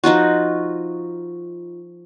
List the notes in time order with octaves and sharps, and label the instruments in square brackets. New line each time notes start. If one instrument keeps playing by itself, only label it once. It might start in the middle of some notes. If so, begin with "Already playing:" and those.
[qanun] F3 D#4 F4 F#4